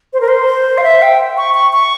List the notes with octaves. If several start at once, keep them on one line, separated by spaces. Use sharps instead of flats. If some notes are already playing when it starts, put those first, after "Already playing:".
C5
A#4
C5
F5
E5
G5
C#6
C#6
C#6